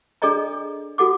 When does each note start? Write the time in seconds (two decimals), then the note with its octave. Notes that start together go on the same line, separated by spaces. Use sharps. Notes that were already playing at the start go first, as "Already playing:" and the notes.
0.22 D4 G#4 A4 D5 D#5 A#5
0.98 F#4 A4 F#5 D6